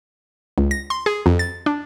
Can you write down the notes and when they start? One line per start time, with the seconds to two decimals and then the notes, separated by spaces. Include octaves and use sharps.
0.58 C#2
0.71 A#6
0.90 C6
1.06 G#4
1.26 F2
1.39 A6
1.66 D4